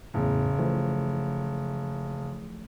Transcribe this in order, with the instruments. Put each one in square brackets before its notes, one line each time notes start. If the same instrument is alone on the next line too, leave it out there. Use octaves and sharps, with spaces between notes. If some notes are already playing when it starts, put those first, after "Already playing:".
[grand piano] F#1 [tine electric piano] E2 A2
[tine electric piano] E3 F3 A3